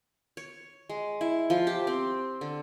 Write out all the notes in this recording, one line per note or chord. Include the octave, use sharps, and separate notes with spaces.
C#5
G#3
E4
F3
G4
C4
D3